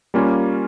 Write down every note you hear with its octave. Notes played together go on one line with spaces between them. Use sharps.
G3 A#3 C#4 F4